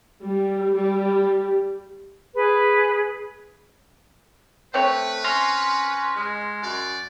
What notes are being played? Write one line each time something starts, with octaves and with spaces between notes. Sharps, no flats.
G3
G3
G#4 B4
A3 C4 B4 C#5
C#4 C6 F6 A#6
G#3
F#2 D5